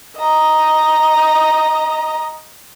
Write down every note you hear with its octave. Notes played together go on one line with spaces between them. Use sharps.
D#5 A#5